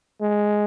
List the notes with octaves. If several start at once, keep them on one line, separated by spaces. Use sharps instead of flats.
G#3